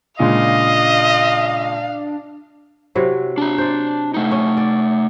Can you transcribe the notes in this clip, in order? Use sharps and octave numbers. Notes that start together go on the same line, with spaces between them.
A#2 C#3 G#3 D4 D#5 F5
C3 F#3 E4
D4 A#5
C5 D5
A3 D#4
C#4
D5